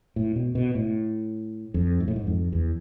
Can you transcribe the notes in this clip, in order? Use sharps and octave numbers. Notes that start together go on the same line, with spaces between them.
A2
B2
B2
A2
F2
G#2
A2
G#2
F2
E2